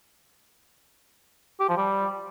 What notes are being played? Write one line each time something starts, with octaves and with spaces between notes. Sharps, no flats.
G4
F3
G3